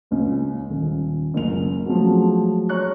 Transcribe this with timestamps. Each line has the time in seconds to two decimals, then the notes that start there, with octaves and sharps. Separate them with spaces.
0.11 C#2 C#4
0.70 D#1
1.34 F#1 C#2 F7
1.86 F3 F#3 G#3 A3 C#4 F#4
2.69 C#5 A#5 C#6 F6 F#6